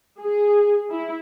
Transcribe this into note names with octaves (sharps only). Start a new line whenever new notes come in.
G#4
E4